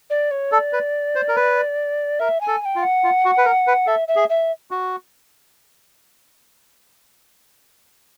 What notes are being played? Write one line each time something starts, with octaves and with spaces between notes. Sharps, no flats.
D5
C#5
A4 D5
B4
C5
A#4
B4
A#4 E5
G#5
A4
G#5
G5
F4
F#5
F4
F#4
B4
A#4
B4
A4 E5
E5
G#4
E5
F#4